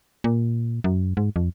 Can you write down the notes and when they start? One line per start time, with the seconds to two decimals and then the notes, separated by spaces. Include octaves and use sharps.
0.24 A#2
0.84 F#2
1.17 G#2
1.36 F2